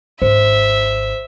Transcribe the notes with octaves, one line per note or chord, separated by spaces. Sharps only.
G#1 C5 E5